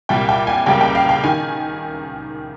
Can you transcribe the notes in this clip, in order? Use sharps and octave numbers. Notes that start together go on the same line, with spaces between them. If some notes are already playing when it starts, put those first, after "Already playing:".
C2 A#2 G3 G5
G5
G#5
C#2 C#3 G3 A#3 G5
G5
F5
G5
D#3 G#5